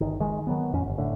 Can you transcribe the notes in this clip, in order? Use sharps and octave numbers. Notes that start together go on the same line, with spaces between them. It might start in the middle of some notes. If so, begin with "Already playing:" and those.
G1 D#3
D#3 G#3
D#3 F#3 B3
A1 F2 C#4
G1
A2 D3